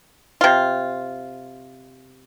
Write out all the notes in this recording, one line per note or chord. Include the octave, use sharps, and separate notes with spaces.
C3 F4